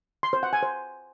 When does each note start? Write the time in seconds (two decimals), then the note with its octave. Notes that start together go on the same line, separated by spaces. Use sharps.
0.23 C6
0.33 C5
0.43 F#5
0.53 G#5
0.63 C5